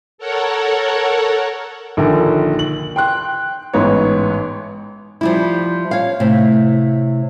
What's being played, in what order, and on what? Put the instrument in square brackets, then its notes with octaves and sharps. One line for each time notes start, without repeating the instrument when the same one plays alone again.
[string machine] A4 A#4 C#5 F#5
[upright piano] A#1 A#2 D3 D#3
F#7
G5 C6 F#6
A1 G#2 B3 C#5
[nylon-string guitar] F3 G3 E4
C#5 F5
A2 C3